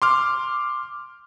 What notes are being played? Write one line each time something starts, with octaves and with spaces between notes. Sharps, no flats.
C6 D6 F6